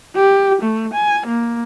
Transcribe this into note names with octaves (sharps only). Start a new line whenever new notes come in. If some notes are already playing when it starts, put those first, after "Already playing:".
G4
A3
G#5
A#3